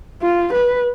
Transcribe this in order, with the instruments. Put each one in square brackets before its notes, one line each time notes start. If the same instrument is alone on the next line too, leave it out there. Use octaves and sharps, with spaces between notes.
[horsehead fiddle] F4
B4